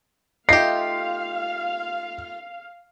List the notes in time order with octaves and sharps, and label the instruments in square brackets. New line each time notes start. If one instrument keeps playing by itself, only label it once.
[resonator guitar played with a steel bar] A3 F4 [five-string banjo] D#4 G4 [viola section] F5 [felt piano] C7